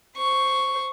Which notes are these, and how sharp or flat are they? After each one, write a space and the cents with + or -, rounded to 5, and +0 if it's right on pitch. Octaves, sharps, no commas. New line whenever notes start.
C5 +0 C#6 +0